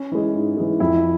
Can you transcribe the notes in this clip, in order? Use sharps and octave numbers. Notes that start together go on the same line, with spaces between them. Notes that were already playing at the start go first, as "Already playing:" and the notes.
Already playing: C#4
E3 G#3
G#2
E3 G#3
F2 E4